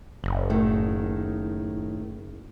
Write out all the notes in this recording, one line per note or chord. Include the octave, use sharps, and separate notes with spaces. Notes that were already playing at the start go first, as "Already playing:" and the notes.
F#1
A2 D#3